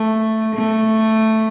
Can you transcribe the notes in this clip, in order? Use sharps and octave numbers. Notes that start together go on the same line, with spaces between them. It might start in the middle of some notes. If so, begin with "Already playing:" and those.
Already playing: A3
A3